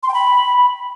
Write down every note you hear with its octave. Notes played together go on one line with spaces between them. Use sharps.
C6
G5
B5